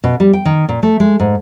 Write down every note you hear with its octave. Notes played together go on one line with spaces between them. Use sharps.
B2
G3
G5
D#3
A#2
A3
G#3
G#2